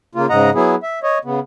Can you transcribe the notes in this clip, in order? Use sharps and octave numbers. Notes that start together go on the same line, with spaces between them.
C#3 A#3 F4
G#2 C#3 D#5 F#5 A#5
F#3 B3 E4 G#4
E5
C#5 D#5
C#3 B3